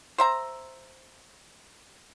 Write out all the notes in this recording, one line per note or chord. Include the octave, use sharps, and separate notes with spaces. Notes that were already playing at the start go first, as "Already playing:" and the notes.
C5 E5 A#5